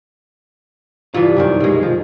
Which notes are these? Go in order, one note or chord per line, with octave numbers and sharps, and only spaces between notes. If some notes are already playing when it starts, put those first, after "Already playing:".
E2 G2 C3 E3 F4
C2 F#2 D#3
B2 G#3
F3